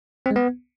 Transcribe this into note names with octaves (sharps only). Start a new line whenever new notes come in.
C4
G#3
B3